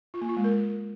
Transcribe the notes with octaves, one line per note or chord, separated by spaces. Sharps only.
F4
A#3
F4
G#3
A#4